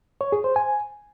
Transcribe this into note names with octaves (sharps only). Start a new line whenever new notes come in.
C#5
G#4
C5
G#5